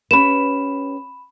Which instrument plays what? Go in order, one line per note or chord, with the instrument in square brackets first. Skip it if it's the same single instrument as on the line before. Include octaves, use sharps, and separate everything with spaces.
[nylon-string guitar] C#4 G4 B4 [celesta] B5 E7